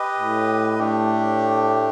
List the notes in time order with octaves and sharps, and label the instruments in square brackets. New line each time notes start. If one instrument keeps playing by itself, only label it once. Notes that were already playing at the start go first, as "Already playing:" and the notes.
Already playing: [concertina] G4 B4 D#5
[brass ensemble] A2
[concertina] A3 D4 G4